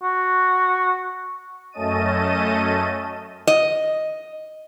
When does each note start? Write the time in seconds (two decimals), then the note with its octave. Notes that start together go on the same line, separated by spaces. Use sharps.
0.03 F#4
1.72 F#2 A3 C#4 D#5 A5 D#7
3.47 D#5